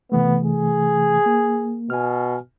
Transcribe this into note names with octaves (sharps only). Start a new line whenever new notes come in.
C3 E3 A3 B3
G#4
A#3
B2 G#5 F6